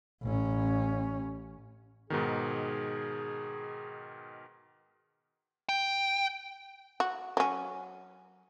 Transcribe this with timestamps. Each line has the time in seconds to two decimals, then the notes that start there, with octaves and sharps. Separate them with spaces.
0.23 A1 C#4
2.10 G#2 B2 D#3 G#4
5.69 G5
7.00 F#4
7.37 F#3 C#4